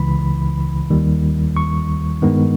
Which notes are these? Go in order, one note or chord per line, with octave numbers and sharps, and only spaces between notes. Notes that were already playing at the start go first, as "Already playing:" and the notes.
Already playing: C#2 C#3 E3 B5
D#2 D#3 G3
C#6
G2 D#3 G#3 B3